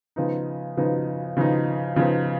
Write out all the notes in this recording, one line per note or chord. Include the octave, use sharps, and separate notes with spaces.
C#3 F3 B3 D#4
C#3 F3 B3 D#4
C#3 F3 B3 D#4
C#3 F3 B3 D#4